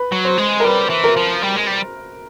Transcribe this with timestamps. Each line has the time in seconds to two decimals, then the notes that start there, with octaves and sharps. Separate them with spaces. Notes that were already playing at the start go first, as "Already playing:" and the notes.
Already playing: B4
0.12 F#3
0.25 C5
0.38 G#3
0.60 A#4
0.65 G3 B4
0.90 E3
1.04 A#4
1.17 F3
1.43 G3
1.56 G#3
1.67 G3